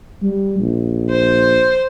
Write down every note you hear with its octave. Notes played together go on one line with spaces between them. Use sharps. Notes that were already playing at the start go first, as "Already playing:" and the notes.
G3
A#1
C5